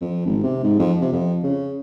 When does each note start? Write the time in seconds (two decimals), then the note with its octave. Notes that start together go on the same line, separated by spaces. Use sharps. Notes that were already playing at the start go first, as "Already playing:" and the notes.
0.01 F2
0.26 G#1
0.43 C3
0.63 G#2
0.79 F2
1.01 C3
1.12 F2
1.43 C#3